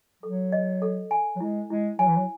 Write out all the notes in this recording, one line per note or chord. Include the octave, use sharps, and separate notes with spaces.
F#3 A4
D#5
A4
G#5
F#3
G#3 E4
G#3 E4
F#3 G#5
E3
F#3